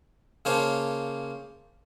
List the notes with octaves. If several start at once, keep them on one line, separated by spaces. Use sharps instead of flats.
C#3 A#3 C5 C#5 A5